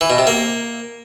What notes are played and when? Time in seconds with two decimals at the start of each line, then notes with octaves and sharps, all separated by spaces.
0.01 E3
0.10 B2
0.18 C3
0.27 A#3